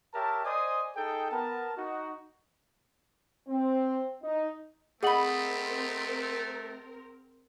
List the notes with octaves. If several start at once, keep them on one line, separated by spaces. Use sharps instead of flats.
G4 A#4 C#5 E5 A5
C5 D5 D#5 G#5 C6 D#6
D#4 G#4 A4 G5
B3 A#4 A5
D#4 F#4
C4
D#4
A3 C4 G#4 A#4 D#5 F#5 B5 F#7